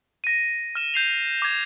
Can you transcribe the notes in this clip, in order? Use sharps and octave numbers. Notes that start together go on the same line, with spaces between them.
A#6 D#7
F6 E7
G6 C7 F7
D6 G#6